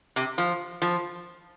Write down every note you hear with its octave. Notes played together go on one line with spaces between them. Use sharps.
C3
F3
F3